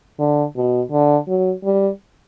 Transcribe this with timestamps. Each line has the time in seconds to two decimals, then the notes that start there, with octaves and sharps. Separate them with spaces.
0.19 D3
0.56 B2
0.92 D3
1.28 F#3
1.64 G3